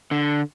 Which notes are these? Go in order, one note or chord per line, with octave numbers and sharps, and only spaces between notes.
D3